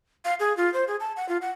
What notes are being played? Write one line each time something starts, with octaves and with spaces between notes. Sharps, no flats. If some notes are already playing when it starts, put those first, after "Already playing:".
F5
G#4
F4
C5
G#4
A5
F#5
F4
F#5